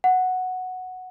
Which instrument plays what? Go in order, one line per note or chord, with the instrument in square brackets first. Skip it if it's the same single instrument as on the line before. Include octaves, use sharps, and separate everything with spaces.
[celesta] F#5